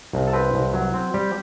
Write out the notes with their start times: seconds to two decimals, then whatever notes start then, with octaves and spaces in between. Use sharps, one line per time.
0.13 C2
0.27 A4
0.33 C4 B4
0.54 C2
0.73 F#3
0.94 C4
1.14 G3 G4